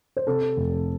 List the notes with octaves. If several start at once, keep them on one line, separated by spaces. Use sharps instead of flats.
C5
C3 A4
F1